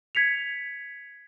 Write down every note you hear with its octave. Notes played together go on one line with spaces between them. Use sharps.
G#6 B6 C#7 F7